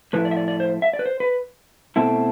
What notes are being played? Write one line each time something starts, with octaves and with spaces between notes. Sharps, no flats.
A2 F3 A3 E4 B4
D5
E5
D5
D5
C5
E5
D5
B4
C5
B4
B2 A3 C4 E4 A4